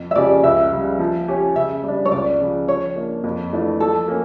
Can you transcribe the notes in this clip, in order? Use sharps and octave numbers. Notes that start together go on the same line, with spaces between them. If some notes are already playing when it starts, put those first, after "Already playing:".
Already playing: F2
E5
C#3 F3 C#4 G4 D5
C#2 E5
C#3 G3
F3
C#4 G4 C#5
C#3 E5
G3 D4
C#5
C#2 D5
C#3 F3
F3 C#5
A#3 D4
F2
E3 A3 D4 F4
F3 A4
A#3 C#4